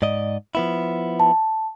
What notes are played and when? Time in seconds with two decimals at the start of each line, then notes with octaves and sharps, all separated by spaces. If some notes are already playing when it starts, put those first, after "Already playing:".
0.02 G#2 D5 D#5
0.55 F3 B3 E4
1.20 A5